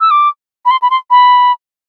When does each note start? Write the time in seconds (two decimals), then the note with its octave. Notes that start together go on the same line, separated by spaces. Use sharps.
0.01 E6
0.11 D6
0.65 B5
0.71 C6
0.82 B5
0.90 C6
1.10 B5